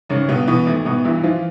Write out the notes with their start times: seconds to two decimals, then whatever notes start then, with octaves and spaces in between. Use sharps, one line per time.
0.09 G#1 C#3 C#4
0.29 G2 B2 B3
0.48 B2 E3 B3
0.67 G#1 A3
0.85 G#1 B2 B3
1.05 G2 E3 E4
1.23 E3 F3 F4